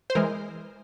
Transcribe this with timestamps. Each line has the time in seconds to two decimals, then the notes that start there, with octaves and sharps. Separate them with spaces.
0.10 C5
0.15 E3 G#3 A#4